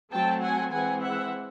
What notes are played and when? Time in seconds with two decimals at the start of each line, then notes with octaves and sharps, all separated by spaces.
0.12 F#3 A3 C4 G5 A5
0.42 F#5 G#5
0.72 E3 G#3 C4 F#5 G#5
1.02 E5 F#5